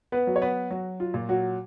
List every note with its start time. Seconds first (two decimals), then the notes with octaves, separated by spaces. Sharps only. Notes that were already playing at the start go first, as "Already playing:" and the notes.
0.12 B3 B4
0.27 F#3
0.36 C#5
0.42 B3 B4
0.70 F#3 F#4
1.00 F4
1.14 A#2
1.29 F#3 F#4